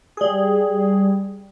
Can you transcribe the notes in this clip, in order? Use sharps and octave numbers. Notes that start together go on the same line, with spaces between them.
G3 G#4